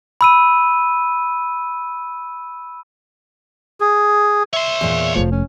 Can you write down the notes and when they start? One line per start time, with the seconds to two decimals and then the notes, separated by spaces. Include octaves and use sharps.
0.21 B5 E6 D#7
3.81 G#4
4.53 C#5 E5 C6
4.81 E2 A#2
5.15 F1 C#2 F3 A3
5.32 C#4